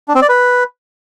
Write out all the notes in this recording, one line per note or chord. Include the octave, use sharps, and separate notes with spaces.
D4
C4
D5
B4